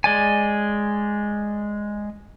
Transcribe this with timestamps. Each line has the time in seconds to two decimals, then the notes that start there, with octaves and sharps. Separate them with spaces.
0.04 G#3 D5 G#5